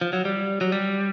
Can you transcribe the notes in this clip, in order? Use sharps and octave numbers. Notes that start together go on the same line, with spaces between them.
F3
F#3
G3
F#3
G3